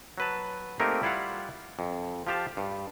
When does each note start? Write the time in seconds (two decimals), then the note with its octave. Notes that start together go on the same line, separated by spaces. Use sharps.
0.18 F#3 B4 A5
0.80 A3 A#3 C4 D#4 G4 A#4
1.02 G3 E4 F4 F5 F#5
1.79 F2
2.27 F3 F4 G4 F5 A5
2.57 G2